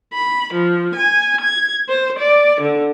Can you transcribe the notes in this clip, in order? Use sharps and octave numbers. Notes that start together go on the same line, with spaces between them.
B5
F3
G#5
G#6
C5
D5
D3